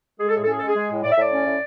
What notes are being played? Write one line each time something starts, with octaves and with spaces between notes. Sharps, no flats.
G#3 G#4
A4
A2 G#4
A4
C#4 G#4
G#3 A4
G#4
G#3
A2
A2 D5
E5
A2 D5
C#4
A2